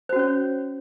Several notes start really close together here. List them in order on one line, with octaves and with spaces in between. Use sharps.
C5 F#4 C#4 C#5